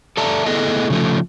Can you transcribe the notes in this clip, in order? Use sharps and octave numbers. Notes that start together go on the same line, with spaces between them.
A4 D5 E5 A5 A#5
A3 B3 E4 G#4 A4 D#5
C#3 F3 A3